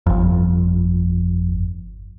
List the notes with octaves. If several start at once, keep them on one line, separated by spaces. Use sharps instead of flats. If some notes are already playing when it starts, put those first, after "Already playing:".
G1 F2